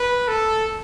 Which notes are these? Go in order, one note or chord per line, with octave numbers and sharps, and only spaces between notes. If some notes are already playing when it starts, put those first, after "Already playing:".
Already playing: B4
A4